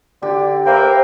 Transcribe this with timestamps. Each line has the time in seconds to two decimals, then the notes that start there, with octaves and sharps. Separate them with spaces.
0.22 D3 G4
0.66 A#3 B4 C5 E5 G5